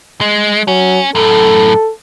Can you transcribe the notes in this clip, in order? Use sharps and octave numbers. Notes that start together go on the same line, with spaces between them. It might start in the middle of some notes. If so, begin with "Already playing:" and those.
G#3
F#3 C#4
F#2 A2 A4